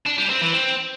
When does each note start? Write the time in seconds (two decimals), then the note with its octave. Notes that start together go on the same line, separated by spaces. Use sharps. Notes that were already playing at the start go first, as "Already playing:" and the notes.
0.06 D4
0.18 G3
0.29 C4
0.41 E3
0.53 C4